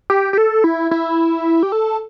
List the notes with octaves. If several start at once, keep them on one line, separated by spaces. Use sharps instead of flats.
G4
G4
A4
E4
E4
G4
A4